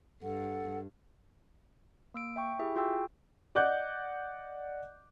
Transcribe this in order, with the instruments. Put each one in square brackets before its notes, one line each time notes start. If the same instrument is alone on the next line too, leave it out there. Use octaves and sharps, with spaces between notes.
[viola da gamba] G2 [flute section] A4 F#5
[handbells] A#3 E6 D7
E5 G5 C#6
E4 G4 G#4 E5
F4 F#4 G#4 G5 E6
[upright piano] D5 D#5 F#5 D6 F#6 G6